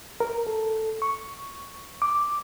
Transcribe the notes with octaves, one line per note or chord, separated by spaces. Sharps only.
A#4
A4
C#6
D6